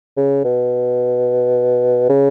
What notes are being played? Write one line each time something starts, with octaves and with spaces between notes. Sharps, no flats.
C#3
B2
C#3